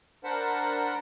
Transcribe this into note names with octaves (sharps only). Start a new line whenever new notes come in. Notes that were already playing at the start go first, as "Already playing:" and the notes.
D4 A#4 C5 F#5 A5 B5